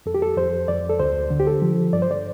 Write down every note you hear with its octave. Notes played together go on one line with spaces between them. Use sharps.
F2 A4
G4
A4
F2 C5
F2 D5
A4
D2 C5
D3
G4
A4
F3
G2 D5
C5
D5